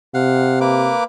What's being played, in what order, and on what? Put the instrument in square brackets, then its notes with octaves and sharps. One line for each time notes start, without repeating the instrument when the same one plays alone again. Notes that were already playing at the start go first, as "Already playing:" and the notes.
[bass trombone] C3 [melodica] F5 F#5
[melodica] A#3 B4 D6